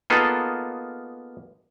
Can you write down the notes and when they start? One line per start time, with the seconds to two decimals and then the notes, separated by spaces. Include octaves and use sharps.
0.10 A#3 B3 D#4 F4 G#4 A4